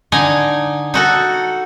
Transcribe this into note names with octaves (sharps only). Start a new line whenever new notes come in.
D3 D#4 G#5 A#5
D#4 F#4 A4